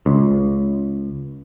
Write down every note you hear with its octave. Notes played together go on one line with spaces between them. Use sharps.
C#2